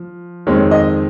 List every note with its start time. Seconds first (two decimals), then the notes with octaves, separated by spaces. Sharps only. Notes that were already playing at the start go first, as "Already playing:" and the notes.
Already playing: F3
0.47 F2 D#3 G#3 C4 C#5
0.71 D#5